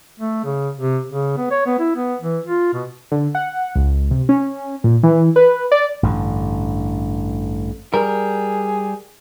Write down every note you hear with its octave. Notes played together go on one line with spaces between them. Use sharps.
A3
C#3
C3
C#3
B3
C#5
B3
E4
B3
E3
F4
B2
D3
F#5
C#2
C3
C#4
A#2
E3
B4
D5
A1 G2 B2 D3
G3 G#4 A#4